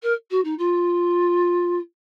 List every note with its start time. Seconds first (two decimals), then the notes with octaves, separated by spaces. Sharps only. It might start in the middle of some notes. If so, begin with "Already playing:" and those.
0.02 A#4
0.30 F#4
0.44 D#4
0.58 F4